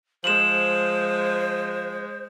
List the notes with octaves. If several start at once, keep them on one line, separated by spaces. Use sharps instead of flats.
F3 G#3 C5 E7 F#7